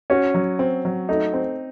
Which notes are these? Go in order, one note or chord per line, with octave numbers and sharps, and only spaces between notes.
C#4 F#4
F#3
C4
F#3
A3 D#4
C4